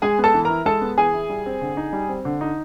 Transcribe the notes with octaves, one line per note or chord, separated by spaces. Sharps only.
G#3 G#4 G#5
B3
A4 A5
E3
E4 A#4 A#5
G#3 A4 A5
B3
E3 G#4 G#5
E4
G3
C4
D3
D#4
G3
C4
D3
D#4